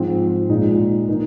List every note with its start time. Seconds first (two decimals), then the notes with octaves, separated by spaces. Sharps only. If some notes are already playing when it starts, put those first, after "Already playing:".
Already playing: G#2 F3 G#3 C4
0.50 A#2 G#3 D#4
1.08 D#3 A#3 D#4